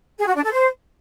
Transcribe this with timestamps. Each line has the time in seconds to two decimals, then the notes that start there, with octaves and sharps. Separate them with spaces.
0.18 G#4
0.27 F#4
0.35 D4
0.43 A4
0.52 C5